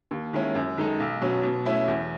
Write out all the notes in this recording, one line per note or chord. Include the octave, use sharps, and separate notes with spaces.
D#2
D#3 G#3 C#4 E4
F#2
D#3 G#3 D#4 A4
B1
B2 F#3 C#4
B2
A3 C#4 E4
E2